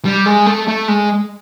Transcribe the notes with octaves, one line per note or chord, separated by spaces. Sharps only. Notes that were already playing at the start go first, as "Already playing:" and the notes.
G3
G#3
A3
A3
G#3